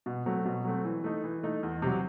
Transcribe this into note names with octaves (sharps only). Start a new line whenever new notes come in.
B2
F#3 A3 C4
B2
F#3 A3 C4
E3
A3 D#4
E3
A3 D#4
E2
C3 F#3